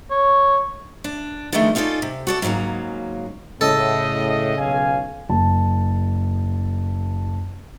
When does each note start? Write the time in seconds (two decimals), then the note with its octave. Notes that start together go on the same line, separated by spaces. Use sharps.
0.11 C#5
1.04 D4
1.52 D3 D#3 F3 G#3 A3
1.75 C#4 D#4 F4 G4 A4 D5
2.02 C3
2.27 F#4 A4 D5
2.42 G#2 C#3 F3 F#3 A#3
3.61 A2 C#3 A4 D#5
4.58 B1 F5 G#5
5.29 F#1 A5